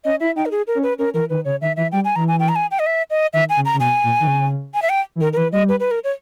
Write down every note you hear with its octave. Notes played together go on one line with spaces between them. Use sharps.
C#4 D#5
E4 E5
D#4 G5
A#4
G#4
A#4
C#4
B4
C#4 A#4
E3 A#4
D#3 B4
C#3 C#5
D#3 E5
E3 E5
G3 G5
G#5
E3 A#5
G#5
G5
A#5
G#5
G5
D#5
E5
D#5
D#3 E5
G#5
C#3
A#5
C#3
B2 G#5
A#2
D#3
C#3
G#5
E5
G5
E3
D#3 A#4
A#4
E3 B4
G3 D#5
B4
B4
A#4
C#5